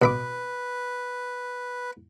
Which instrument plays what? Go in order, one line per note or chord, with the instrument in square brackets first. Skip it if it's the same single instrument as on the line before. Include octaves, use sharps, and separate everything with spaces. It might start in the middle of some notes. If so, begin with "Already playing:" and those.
[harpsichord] B2 B5 D6 [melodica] B4